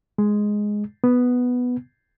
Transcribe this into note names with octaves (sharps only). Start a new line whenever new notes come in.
G#3
B3